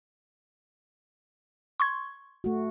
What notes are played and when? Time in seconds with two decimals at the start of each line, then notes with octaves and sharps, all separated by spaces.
1.80 C6 C#6 G#6
2.44 A3 F#4